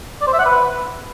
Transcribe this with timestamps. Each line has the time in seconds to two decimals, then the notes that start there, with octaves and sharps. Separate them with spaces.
0.21 D5
0.27 C5
0.33 E5
0.39 F#5
0.45 B4